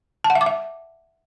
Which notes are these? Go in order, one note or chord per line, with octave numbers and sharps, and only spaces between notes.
A5
F#5
E5
D6
E5